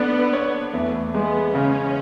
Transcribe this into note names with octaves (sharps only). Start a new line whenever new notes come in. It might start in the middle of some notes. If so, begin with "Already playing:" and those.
Already playing: B3 D4 A4
C#5
E2 A3
G#3 B3
C#3 C#4